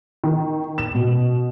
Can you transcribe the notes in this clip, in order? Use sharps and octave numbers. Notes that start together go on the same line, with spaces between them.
D#3
E7
B2